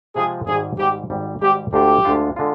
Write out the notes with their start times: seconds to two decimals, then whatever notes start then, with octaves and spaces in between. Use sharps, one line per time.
0.15 C3 F3 G#3 G#4
0.47 G#1 G#2 G3 G#4
0.78 G#1 G#2 G3 G4
1.10 G#1 G#2 G3
1.41 G#1 G#2 G3 G4
1.73 D2 D3 G#3 D4 F4 G4
2.05 D2 D3 G#3 D4 F4
2.36 D3 G#3 D4 F4